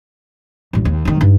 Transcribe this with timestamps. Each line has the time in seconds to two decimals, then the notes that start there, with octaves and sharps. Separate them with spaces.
0.73 A1 G2
0.85 D#2
1.05 F1 D#3
1.21 G2 D#4